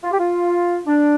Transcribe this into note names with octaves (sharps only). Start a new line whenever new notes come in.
F4
G4
F4
D4